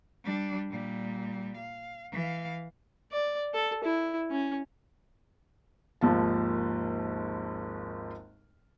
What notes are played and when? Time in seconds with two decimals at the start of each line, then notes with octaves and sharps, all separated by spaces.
0.24 G3 D4
0.70 A#2 G3
1.57 F5
2.12 E3 F5
3.12 D5
3.54 A4
3.84 E4
4.31 C#4
6.01 G#1 D#2 F3 F5 A5